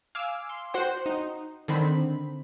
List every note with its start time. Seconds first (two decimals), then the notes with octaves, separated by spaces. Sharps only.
0.15 F5 G#5 D6 E6
0.49 C6
0.74 F#4 C5 F#5 G5
1.06 D#4
1.68 D3 D#3 C4 B5